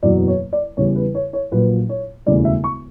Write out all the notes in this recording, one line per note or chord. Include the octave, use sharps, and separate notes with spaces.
F#1 E2 B2 F#3 D5
C#5
D5
E2 C#3 G3 C#5
B4
C#5
C#5
A#1 A#2 F#3 B4
C#5
E1 D2 C#3 E3 G3 D5
E5
C#6